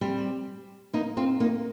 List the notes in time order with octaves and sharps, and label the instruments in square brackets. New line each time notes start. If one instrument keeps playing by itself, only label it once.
[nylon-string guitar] G3 C4
A#3 D#4
C4 F4
A#3 D#4